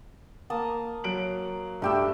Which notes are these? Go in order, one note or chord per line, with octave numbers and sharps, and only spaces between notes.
A#3 A5 D#6
F#3 D7 F#7
G2 A3 G4 E5 G5 E6